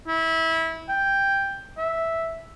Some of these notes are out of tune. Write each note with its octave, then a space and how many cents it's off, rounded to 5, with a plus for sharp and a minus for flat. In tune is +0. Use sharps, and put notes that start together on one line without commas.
E4 -20
G5 +10
E5 -5